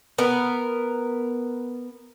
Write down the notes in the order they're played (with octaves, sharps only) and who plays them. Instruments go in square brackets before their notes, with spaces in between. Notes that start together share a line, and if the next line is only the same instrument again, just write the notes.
[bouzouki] B3 A#4